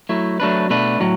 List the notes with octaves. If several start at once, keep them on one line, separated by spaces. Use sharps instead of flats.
F#3 A3 E4
F#3 A3 D4 B4
B2 A3 D4 B4
A2 F#3